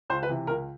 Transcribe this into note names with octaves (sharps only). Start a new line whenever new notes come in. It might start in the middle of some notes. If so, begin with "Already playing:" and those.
C#2 C5
B4
C3 E3
C#2 A#4